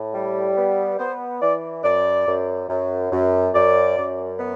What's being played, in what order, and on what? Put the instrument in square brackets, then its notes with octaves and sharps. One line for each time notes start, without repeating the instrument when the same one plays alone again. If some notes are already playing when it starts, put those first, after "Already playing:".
Already playing: [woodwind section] A2
G3
B3
B3 C5
E3 D5
F#2 D5
F#2
F#2
F#2
F#2 D5
F#2
B3